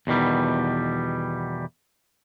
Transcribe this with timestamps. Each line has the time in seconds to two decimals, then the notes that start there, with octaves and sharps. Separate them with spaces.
0.07 E2 B2 D#3 G3